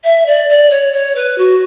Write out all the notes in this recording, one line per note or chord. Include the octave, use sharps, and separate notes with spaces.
E5
D5
D5
C#5
C#5
B4
F#4